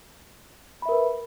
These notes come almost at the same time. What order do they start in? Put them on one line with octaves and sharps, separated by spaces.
B5 E5 A#4 B4